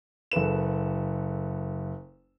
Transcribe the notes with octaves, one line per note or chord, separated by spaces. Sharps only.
F#1 A4 B4 E7